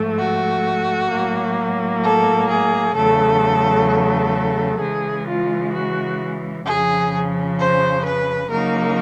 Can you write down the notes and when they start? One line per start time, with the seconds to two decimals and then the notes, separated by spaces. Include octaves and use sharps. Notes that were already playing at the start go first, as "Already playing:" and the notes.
Already playing: G#2 F3 A3
0.19 F#4
1.11 A2 F#3 A#3
2.03 A4
2.50 G#4
2.96 E2 C#3 F#3 A3 A4
3.89 A4
4.81 C#3 E3 G#3 G#4
5.28 F4
5.74 F#4
6.66 F2 C#3 F3 G#4
7.59 C5
8.05 B4
8.51 C#3 F#3 A#3 D#4 A#4